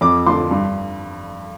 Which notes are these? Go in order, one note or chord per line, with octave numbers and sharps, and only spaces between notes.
F2 D6
D3 F3 C6
G2